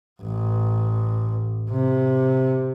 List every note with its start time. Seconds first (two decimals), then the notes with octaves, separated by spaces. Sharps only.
0.22 A1
1.70 C3